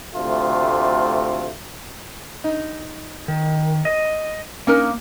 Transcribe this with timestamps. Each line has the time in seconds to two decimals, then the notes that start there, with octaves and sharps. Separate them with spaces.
0.14 D2 C3 A3 F4
2.44 D#4
3.28 D#3
3.85 D#5
4.67 A#3 C#4 D#4 A#4